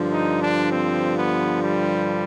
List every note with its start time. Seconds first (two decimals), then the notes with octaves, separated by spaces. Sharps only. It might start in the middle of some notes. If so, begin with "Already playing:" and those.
Already playing: G2 D3 F3
0.10 D#4
0.40 D4
0.71 C4
1.16 B3
1.62 G3